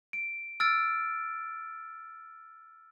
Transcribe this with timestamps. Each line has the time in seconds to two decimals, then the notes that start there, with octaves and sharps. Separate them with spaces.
0.13 D7
0.60 E6 F6 A6 D7